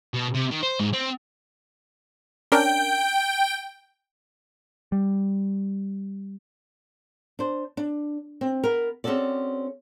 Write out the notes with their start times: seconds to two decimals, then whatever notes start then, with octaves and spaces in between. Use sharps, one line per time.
0.14 B2
0.34 C3
0.51 D#3
0.63 C5
0.80 G#2
0.93 C4
2.52 C#4 D4 A#4 G5
4.92 G3
7.39 D4 C5
7.77 D4
8.41 C4
8.64 B3 A#4
9.04 C4 C#4 F#4 G#4 A4 D5